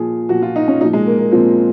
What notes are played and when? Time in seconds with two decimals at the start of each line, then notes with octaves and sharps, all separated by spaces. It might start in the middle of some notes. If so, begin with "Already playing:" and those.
Already playing: A#2 F3 G#4
0.29 A#2 F3 F#4
0.42 F4
0.56 D#4
0.68 C#4
0.80 A#2 D#4
0.84 F3
0.93 G#3
1.06 A#3
1.18 A#3
1.31 A#2 F3 C4